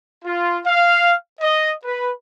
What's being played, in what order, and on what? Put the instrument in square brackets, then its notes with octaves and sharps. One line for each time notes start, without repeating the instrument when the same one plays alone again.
[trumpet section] F4
F5
D#5
B4